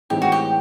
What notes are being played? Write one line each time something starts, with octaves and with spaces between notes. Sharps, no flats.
A2 E3 G#3 C4 D#4 G4
F#4
G4